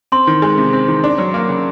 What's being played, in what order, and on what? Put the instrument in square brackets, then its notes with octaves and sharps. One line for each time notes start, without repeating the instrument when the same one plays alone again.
[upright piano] C4 [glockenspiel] C6
[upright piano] D#3
G#3
C3
C4
D#3
D4
F#3
A#3
C#3